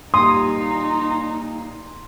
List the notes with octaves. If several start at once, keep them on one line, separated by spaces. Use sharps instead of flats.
A#2 G3 D#4 C6 D#6